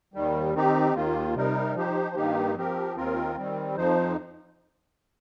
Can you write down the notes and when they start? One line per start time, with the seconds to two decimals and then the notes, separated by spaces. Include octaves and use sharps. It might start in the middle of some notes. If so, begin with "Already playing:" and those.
0.14 D#2 D#3 G3
0.54 D#3 C4 D#4 G4
0.94 D#2 D#3 A#3 F4
1.35 C3 G3 D#4 A#4
1.75 F3 D#4 G4 C5
2.15 G2 D#3 A#3 D#4 G4
2.56 F3 C4 G4 A#4
2.96 D#2 D#3 C4 F4 A#4
3.35 D#3 G3 C4
3.76 F2 F3 D#4 C5